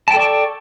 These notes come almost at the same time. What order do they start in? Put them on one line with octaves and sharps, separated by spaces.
A5 G5 A4 D5 C#6